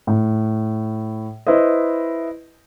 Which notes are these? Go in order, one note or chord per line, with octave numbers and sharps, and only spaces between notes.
A2
E4 B4 C5 D#5